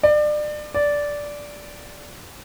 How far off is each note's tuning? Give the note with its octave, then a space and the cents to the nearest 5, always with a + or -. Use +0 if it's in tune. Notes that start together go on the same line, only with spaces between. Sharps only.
D5 +30
D5 -10